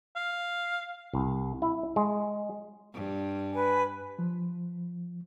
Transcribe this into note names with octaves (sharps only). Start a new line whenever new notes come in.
F5
C2
E4
G#3
G2
B4 G#5
F3